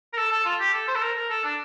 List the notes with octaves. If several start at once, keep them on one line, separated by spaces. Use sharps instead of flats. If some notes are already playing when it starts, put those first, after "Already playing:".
A#4
A4
A4
F4
G4
A4
C5
A4
A#4
A#4
A4
D4